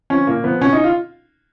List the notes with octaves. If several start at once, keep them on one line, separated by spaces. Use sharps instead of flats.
F3 C#4
A#2 A#3
F3 B3
B2 C#4
D#4
F4